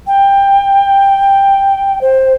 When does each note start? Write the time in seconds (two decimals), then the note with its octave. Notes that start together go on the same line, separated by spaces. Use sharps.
0.07 G5
2.01 C5